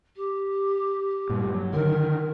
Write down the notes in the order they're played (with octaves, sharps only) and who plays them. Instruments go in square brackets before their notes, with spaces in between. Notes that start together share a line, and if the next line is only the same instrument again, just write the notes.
[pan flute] G4
[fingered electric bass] G2 A#2
F#3
[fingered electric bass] D3 D#3 [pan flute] A#4